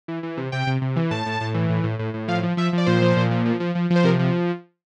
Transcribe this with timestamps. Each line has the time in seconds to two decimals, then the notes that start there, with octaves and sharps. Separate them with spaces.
0.08 E3
0.23 E3
0.37 C3
0.52 C3 G5
0.67 C3
0.82 C3
0.96 E3
1.11 A2 A5
1.26 A2
1.41 A2
1.54 E3
1.70 A2
1.84 A2
1.99 A2
2.14 A2
2.28 F3 F5
2.43 F3
2.57 F3 E5
2.73 F3 D5
2.86 A#2 C5
3.02 F3
3.17 A#2
3.31 F3
3.46 F3
3.60 F3
3.75 F3
3.90 F3
3.96 C5
4.04 C3 A#4
4.19 F3